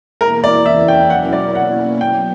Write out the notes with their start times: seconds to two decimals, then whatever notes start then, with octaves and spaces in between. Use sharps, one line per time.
0.21 E2 B2 A#3 E4 A#4
0.44 D5
0.65 E2 C#3 E3 A#3 C#4 E5
0.88 G5
1.10 B2 F#3 C#4 E4 A#4 F#5
1.33 D5
1.55 B2 A#3 C#4 E4 F#5
2.01 F#3 B3 G5